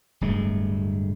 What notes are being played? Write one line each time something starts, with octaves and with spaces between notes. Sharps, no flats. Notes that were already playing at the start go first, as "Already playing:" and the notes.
D1 G2 G#3 A3